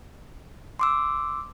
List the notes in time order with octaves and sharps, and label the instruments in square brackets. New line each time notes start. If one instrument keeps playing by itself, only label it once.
[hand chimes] C6 D6 E6